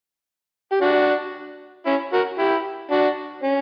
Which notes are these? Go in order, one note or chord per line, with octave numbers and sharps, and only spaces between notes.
G4
D4 F#4
C#4 E4
F#4 A#4
E4 G4
D4 F#4
C#4